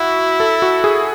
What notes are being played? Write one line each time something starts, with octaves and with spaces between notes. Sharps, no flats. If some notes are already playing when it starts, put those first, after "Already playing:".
Already playing: E4 F#4
A4
F#4
G#4